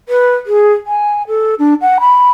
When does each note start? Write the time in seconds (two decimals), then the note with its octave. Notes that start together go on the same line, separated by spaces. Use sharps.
0.09 B4
0.46 G#4
0.86 G#5
1.27 A4
1.59 D4
1.81 F#5
2.00 B5